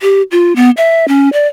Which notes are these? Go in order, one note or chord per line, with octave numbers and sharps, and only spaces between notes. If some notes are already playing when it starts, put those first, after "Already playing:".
G4
F4
B3
E5
C#4
D5